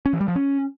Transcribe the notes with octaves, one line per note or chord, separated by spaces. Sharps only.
C#4
E3
G3
F3
C#4